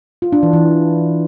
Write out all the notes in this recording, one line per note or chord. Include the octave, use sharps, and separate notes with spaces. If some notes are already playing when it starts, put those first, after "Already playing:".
F4
D4
E3
E3